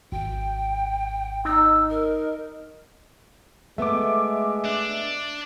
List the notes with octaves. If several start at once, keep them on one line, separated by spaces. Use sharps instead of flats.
G#1 G5
D#4 E6
A#4
G#3 A3 B3 E5 D6
D4